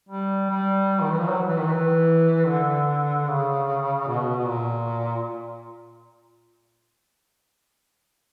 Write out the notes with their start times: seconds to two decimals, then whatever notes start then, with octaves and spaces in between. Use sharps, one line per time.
0.09 G3
0.49 G3
1.01 D#3
1.10 E3
1.19 F3
1.29 F#3
1.48 E3
1.59 D#3
1.68 E3
2.48 D3
3.27 C#3
4.07 B2
4.38 B2
4.48 A#2